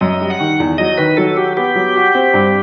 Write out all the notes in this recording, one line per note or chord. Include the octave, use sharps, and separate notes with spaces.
F#2 D#5
G3
F#5
D#3
E2
F#3 D#5
D#3 B4
F#3 A4
F#4 G4
B3 G4
F#3
F#4
C4
G2